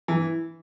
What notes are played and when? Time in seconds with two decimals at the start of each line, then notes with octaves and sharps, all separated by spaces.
0.08 E3